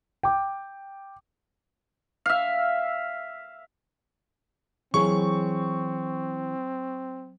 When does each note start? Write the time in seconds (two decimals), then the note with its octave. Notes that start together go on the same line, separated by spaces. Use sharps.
0.23 G5 D6
2.26 E5 F5
4.94 E3 F#3 C4 G#4 C#5 C#6